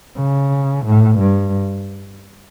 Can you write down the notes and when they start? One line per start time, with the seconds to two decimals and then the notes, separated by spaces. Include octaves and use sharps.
0.18 C#3
0.85 A2
1.19 G2